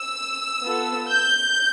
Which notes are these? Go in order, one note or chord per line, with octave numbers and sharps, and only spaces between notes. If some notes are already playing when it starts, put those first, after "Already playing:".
Already playing: E6
B3 F4 A4
G6